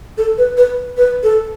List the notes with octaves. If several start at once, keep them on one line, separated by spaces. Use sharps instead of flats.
A4
B4
B4
B4
A4